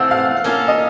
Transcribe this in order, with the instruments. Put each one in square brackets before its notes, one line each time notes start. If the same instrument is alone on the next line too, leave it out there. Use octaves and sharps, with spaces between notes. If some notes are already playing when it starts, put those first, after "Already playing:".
Already playing: [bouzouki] E3 A3 C4 [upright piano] F5 F#5
[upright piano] F5
[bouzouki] A#3 C#4 F4 A4
[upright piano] D#5